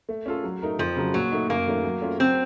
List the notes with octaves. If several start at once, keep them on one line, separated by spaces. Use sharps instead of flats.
A3
C#4 F4 A4
F#3
A3 D#4 A#4
F2 F3
C#3 F#3
A#2 F#3
A3 D#4
F#2 A#3
D#3 F#3 A3 C#4
F#3
A3 C#4 F4
F#3 C4